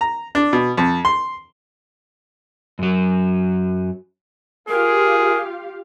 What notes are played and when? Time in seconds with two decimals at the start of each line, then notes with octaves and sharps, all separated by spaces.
0.01 A#5
0.35 D4
0.53 B2
0.78 F2
1.05 C6
2.79 F#2 F#3
4.69 F4 G4 G#4 A#4 F5